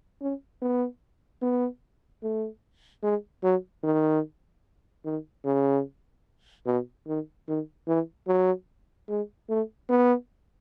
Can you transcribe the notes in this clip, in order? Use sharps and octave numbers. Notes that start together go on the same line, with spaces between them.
C#4
B3
B3
A3
G#3
F#3
D#3
D#3
C#3
B2
D#3
D#3
E3
F#3
G#3
A3
B3